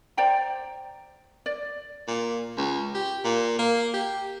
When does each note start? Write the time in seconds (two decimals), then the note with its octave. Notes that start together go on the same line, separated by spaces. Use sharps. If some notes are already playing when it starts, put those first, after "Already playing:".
0.17 C5 D5 G5 A#5
1.46 D5
2.07 A#2
2.57 C#2
2.94 G4
3.24 A#2
3.59 A#3
3.93 G4